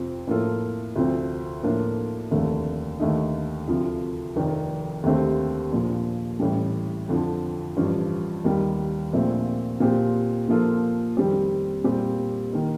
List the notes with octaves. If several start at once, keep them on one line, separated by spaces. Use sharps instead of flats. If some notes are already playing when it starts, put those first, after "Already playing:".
Already playing: F2 C3 F3 C4
A2 F3 A#3 F4 A4
D2 C3 F3 C4
A2 F3 A#3 D4 F4
F1 D#2 D3 A3
D#2 D3 A3 D#4
D2 C3 F3
F1 F2 C3 D#3
D#2 D3 A3 C4 G4
A#1 A#2 F3
A1 A2 G3
F2 D3 F3
A1 G2 F3
D#2 D#3 G3
A#1 A#2 A3 C4
A#2 F3 C4 G4
A#2 F3 A#3 F4 A4
F2 D#3 G3 C4 G4
A#2 G3 C4 G4
D#3 A#3